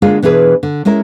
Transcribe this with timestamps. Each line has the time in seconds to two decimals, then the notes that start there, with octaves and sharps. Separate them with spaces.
0.02 D3 G#3 A#3 F4 G#4
0.22 B2 E3 D4 G#4 B4
0.63 D3
0.85 G#3 C#4 E4 A#4